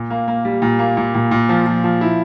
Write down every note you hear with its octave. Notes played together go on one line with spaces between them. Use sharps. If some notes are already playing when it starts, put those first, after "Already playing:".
Already playing: A#2
A#3
A#3
G3
A#2
A#3
A#2
A#2
A#2
F3
F3
F3
E4